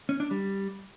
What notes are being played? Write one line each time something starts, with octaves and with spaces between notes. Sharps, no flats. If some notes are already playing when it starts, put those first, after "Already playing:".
C#4
D4
G3